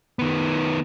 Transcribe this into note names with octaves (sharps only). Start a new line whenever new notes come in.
D#3 B3